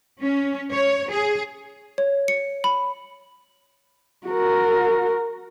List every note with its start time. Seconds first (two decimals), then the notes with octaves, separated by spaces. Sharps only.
0.22 C#4
0.72 C#5
1.10 G#4
1.98 C#5
2.28 C#7
2.64 B5
4.28 F#4 A#4